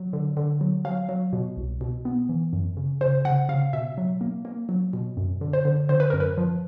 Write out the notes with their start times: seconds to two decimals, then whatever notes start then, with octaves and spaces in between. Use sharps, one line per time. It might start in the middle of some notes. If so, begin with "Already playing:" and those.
Already playing: F#3
0.13 D3
0.37 D3
0.61 F#3
0.85 F#3 F5
1.09 F#3
1.33 B2
1.57 C2
1.81 B2
2.05 B3
2.29 E3
2.53 F#2
2.77 C#3
3.01 C#3 C5
3.25 C#3 F#5
3.49 C#3 F5
3.73 B2 E5
3.98 F#3
4.21 A#3
4.45 A#3
4.69 F#3
4.93 B2
5.17 F#2
5.41 D3
5.53 C5
5.65 D3
5.89 D3 C5
6.00 B4
6.10 F#2 A#4
6.20 B4
6.38 F3